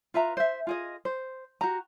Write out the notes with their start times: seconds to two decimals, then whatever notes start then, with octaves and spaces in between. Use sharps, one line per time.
0.14 F4 B4 E5 A#5
0.37 C5 E5
0.67 F4 G#4 D#5
1.05 C5
1.61 F#4 G4 A#5